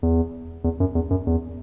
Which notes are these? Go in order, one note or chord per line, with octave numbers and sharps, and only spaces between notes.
E2
E2
F#2
E2
F#2
E2